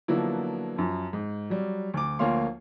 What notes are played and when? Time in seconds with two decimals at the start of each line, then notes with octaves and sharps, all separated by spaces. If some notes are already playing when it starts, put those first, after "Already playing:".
0.08 D3 F3 F#3 A#3 B3 E4
0.76 F#2 F3
1.13 G#2
1.50 F#3 G3
1.94 D2 D6
2.19 D2 F3 A#3 C#5 F5 C6